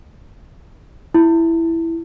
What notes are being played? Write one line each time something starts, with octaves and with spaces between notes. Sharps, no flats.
E4